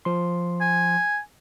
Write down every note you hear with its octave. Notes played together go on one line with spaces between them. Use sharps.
F3 C6
G#5